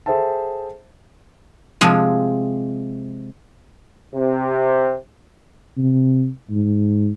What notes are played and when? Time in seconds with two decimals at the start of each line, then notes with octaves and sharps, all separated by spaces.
0.06 G#4 A4 C5 E5 G5 A5
1.81 C3 F3 G#3
4.15 C3
5.77 C3
6.50 G#2